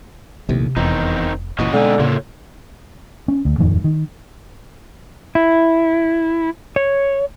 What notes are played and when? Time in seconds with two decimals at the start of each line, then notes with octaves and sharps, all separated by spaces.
0.49 A#1 D#2 A2 C3
0.77 F1 E2 D#3 C4 D#4
1.59 F#1 A#2 E3 C#4 F#4 D#5
1.73 B2 D3 G#3 B3 C4 D#4 G#5
1.99 A2 C#3 A#3 F4 A4 C#5
3.28 C#4
3.45 D2
3.58 D#1 F2 G#2 D#3
3.84 D#3
5.35 E4
6.76 C#5